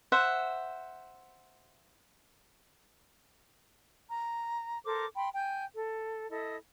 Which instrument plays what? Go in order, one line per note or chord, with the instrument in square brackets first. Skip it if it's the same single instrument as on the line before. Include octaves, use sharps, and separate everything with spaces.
[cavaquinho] C5 E5 F#5
[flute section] A#5
A4 A#4 C5 D6
G5 B5 C6
G5 G#5 G6
A4
E4 A4 D#5